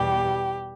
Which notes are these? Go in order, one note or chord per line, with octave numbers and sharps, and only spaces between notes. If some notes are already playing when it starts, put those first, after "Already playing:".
Already playing: E2 B2 G3 G4